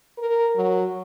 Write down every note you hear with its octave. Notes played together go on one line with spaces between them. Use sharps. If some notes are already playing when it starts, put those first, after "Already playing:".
A#4
F#3